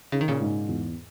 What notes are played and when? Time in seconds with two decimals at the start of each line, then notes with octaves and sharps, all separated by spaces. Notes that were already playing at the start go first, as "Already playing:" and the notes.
0.12 C#3 D#4
0.21 D#3
0.28 A#2 C#3
0.40 G#2
0.68 E2